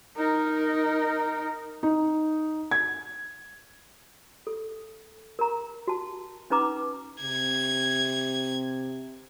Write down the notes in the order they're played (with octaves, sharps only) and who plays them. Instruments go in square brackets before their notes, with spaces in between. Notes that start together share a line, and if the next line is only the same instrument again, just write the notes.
[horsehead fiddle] D#4 A#4
[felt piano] D#4
G#6
[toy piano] A4
A#4 A#5
F#4 A5
C#4 D#4 B4 A#5 D6
[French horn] C3 [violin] G#6